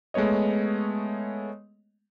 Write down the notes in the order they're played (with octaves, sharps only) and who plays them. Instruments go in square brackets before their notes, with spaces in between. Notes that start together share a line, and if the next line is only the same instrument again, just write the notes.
[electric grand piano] G#3 A3 B3 C#5 D#5